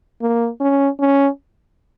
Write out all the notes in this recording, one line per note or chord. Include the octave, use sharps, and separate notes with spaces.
A#3
C#4
C#4